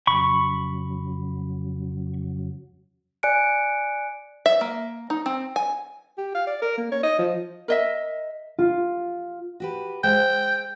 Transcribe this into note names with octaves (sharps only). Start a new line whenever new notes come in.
F2 C#3 F#3 B5 C#6
D5 G#5 F#6 C#7 D7
E5
A#3
D#4
C4
G#5
G4
F5
D5
A#4
A#3
C#5
D#5
F3
A#4 D#5 E5
F4
F#4 G4 B4
G#3 C5 E5 G5